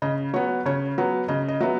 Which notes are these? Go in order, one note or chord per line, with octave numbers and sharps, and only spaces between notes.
C#3 D#5
F#3 B3 C#5
C#3 C#5
F#3 B3
C#3 D#5
D#5
F#3 B3 E5